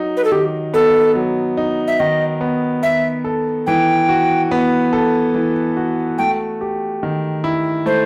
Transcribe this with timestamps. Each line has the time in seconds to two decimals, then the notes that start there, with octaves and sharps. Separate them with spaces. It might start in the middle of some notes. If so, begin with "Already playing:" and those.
Already playing: F#3 D#4
0.17 B4
0.25 A4
0.32 D#3 G4
0.73 B3 A4
1.15 F#3
1.57 D#4
1.88 E5
2.00 D#3 D#5
2.41 B3
2.83 B3 E5
3.24 A4
3.67 E3 G5
4.09 F#4
4.51 B3
4.93 A4
5.34 E3
5.77 F#4
6.18 A3 G5
6.61 G4
7.03 D#3
7.44 E4
7.86 A3 C5